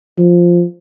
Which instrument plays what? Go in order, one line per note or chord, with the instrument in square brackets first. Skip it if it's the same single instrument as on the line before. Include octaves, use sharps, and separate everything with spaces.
[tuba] F3